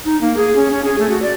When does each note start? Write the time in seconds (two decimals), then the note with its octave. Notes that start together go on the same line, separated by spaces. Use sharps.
0.05 D#4
0.21 A#3
0.37 G#4
0.56 C#4
0.71 C#4
0.85 G#4
0.99 A3
1.10 F#4
1.22 D5